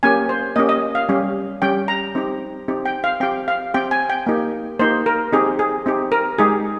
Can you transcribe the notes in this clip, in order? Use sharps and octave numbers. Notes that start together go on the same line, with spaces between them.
A#3 C#4 G4 G#5
C5
A#3 C#4 G4 D#5
D#5
F5
G3 C#4 G4
G3 C#4 G4 G5
A#5
C4 D#4 G4
C4 D#4 G4
G5
F5
C4 G4 G5
F5
C4 G4 G5
G#5
G5
A#3 D#4 G4
A#3 D#4 G4 C5
A#4
C4 D#4 G4 G#4
G#4
C4 D#4 G4
A#4
G#3 D#4 G4 G#4